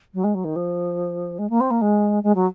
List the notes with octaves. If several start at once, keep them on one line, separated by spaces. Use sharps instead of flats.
F#3
G#3
F#3
D#3
F3
G#3
A#3
C4
A#3
G#3
G#3
F#3